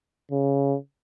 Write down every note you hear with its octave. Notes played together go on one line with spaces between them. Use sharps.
C#3